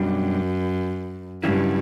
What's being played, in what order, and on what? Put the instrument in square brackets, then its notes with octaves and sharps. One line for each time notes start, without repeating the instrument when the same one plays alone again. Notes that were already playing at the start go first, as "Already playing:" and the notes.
Already playing: [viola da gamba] F#2 [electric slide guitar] B2 G3 D4
[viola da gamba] G2 [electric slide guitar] C#3 F#3 C#4 E4